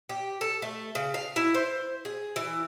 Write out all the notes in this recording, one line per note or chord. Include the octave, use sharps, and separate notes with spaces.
G4
A4
A3
C#3
F5
E4
C5
G#4
E3